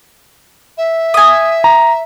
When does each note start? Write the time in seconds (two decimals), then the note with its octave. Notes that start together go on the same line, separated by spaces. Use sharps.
0.77 E5
1.14 G#5 D#6
1.64 A#5